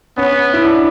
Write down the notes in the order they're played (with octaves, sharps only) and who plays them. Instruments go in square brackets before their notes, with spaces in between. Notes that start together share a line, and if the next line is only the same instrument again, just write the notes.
[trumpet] B3 [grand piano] C#4
[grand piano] E4
D4